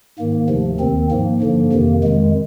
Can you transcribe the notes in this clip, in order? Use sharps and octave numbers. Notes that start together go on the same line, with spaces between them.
G#2 D#3 A#3
D2 C3 F3
D#2 D#3 C4
G#2 F3 A#3
G2 D3 F3
F2 C3 D#3
F2 D#3 G#3